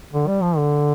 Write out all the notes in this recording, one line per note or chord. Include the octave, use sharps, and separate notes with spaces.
D3
G3
F3
D3